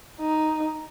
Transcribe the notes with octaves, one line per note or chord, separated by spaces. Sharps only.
D#4